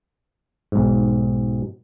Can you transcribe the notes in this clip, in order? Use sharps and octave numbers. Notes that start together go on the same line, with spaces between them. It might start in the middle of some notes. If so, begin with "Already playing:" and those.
B1 G#2